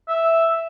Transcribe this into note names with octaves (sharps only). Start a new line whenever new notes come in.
E5